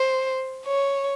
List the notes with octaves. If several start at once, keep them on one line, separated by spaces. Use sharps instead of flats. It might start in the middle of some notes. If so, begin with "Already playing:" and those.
Already playing: C5
C#5